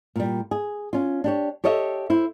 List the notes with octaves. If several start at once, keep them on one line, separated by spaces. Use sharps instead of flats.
A#2 G3
G#4
C#4 F4
D4 G4 C#5
G4 A4 C#5 D#5 E5
E4 C5